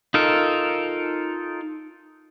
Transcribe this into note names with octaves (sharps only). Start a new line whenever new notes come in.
D#4 F4 A4 A#4